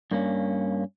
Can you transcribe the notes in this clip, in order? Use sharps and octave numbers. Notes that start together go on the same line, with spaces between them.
G2 A#3 C#4